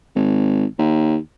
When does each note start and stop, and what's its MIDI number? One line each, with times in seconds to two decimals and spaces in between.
0.16 0.65 32
0.79 1.17 39